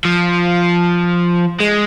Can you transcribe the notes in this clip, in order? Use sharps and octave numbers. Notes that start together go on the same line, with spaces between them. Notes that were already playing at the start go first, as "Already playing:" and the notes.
F3
G#3